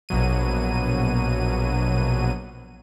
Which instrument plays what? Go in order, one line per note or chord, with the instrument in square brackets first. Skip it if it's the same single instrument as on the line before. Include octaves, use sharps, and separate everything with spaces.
[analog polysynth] A#1 B2 F#3 D#7